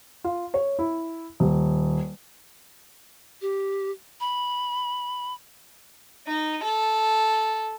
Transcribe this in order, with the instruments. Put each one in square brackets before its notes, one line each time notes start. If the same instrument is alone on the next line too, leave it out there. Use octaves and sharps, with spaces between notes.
[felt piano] F4
C#5
E4
D#1
[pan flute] G4
B5
[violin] D#4
A4